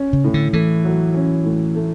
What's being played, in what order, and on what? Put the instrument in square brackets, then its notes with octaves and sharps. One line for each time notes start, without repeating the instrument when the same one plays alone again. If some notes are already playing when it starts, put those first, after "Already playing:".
Already playing: [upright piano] C#4
[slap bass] C#3
[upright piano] A2
[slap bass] D3
[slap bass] E3 [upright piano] A3
[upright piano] F#3
C#4
A2
A3